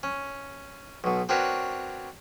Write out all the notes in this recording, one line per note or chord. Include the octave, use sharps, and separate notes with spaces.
C#4
B1 B2
C4 D4 F#4 A#4 B4 C#5